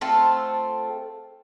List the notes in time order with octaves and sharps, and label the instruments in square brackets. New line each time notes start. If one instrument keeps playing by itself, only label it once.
[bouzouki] A3 C4 F4 A4